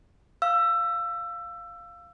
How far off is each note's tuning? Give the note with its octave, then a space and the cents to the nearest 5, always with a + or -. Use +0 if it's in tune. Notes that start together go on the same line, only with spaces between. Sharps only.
F5 +0 E6 +20